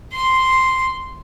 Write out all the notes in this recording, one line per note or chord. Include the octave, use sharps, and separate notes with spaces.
C6